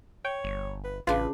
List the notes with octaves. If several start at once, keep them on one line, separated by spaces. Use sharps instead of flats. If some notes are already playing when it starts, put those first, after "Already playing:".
C#5 G5
G1
B4
A1 C#3 D4 F4 B4